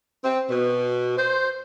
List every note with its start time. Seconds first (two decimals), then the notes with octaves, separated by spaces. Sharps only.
0.24 C4
0.49 B2
1.17 C5